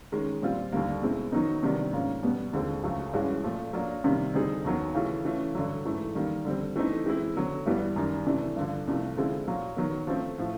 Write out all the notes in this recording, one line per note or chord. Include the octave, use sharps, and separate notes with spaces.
D#3 G#3 C#4
A#2 G3 C4 F4
D#2 D3 G3 A#3
B2 G#3 C4 E4
D#3 F#3 B3 D#4
C3 D#3 G3 B3 D4
G#2 F3 A#3 C#4
B2 G3 B3
D#2 D3 F3 G#3 C4
C#2 C#3 F#3 A3
G2 E3 G#3 C#4 F#4
A#2 F3 A3
F#3 A#3 D4 F4
C3 D#3 G3 A#3
D3 G3 C4 D#4 G#4
D#2 D#3 F#3 B3
C#3 E3 A3 C#4 F4
E3 A3 C#4 F4
G2 D3 F#3
G#2 E3 A3
D#3 G3 A#3
D3 G3 C4
E3 A3 C4 D#4
E3 G#3 C4 E4
D3 F#3 B3
G2 E3 G3 B3
F#2 D#3 G3
C3 E3 A3 D4
G2 D3 F3
C2 C3 F3 A3
D3 F3 G#3 C4 E4
A#2 F#3 A#3
D#3 F#3 B3
F3 A3 C4
A2 F3 A3